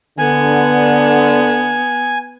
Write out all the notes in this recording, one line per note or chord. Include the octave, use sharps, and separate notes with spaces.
D3 B3 G#5